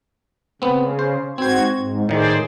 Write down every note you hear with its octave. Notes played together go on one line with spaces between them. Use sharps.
C#3 B3 C4
C5
G#2 C4 F#4 C5 G#6
G#2
A2 D#3 G#4 C5 D5